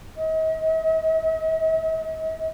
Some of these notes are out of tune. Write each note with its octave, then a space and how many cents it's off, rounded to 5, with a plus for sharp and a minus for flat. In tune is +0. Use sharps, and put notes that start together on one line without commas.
D#5 +45